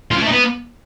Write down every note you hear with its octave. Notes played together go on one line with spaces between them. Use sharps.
F4
C#3
A3
D#4
B3